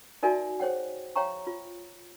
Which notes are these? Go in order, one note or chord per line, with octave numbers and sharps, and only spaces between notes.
D#4 F#4 A#4 D5 E5 G#5
G#4 C5 C#5 F#5 G5
C#5 F5 G5 A#5 C#6
F4